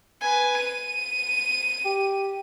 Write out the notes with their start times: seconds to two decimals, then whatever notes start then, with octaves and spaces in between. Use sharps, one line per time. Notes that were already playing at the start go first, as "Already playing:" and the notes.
0.21 B4 G#5
0.57 D#7
1.85 G4